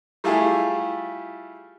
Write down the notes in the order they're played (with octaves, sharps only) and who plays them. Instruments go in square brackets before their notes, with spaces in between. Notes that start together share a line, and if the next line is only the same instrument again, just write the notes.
[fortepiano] G3 A3 E4 F4 G4 G#4